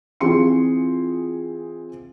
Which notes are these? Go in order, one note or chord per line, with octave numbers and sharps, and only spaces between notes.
E3 C4 F4 G#4 C6 C#7